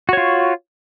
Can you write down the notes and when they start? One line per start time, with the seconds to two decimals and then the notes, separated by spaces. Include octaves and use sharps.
0.09 F#4
0.13 C#5
0.17 F4